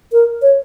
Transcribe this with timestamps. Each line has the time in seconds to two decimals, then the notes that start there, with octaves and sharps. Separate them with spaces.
0.12 A#4
0.42 C#5